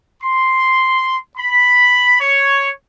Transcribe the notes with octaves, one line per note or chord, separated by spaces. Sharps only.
C6
B5
C#5